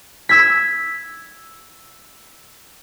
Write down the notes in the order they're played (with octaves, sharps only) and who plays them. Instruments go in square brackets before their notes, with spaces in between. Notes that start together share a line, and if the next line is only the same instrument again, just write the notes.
[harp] E6 G#6 B6